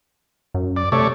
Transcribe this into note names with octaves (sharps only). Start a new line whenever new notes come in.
F#2
D5
C3 A3 C#5 D5